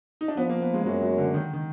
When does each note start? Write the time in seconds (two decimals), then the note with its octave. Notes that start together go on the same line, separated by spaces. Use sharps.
0.21 D#4
0.28 D4
0.37 F3 B3
0.49 A#3
0.62 B3
0.74 G#3
0.86 F#2 F#3
1.02 F#3
1.18 D3
1.34 D#3
1.53 D#3